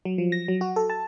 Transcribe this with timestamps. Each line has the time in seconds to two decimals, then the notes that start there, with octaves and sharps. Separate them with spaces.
0.05 F#3
0.18 F3
0.32 A#6
0.48 F#3
0.61 F#4
0.76 A4
0.90 A5